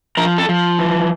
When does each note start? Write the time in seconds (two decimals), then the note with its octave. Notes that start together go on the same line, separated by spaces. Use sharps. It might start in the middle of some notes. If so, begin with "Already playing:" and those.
0.17 F3 A#4
0.38 A4
0.49 F3
0.79 E3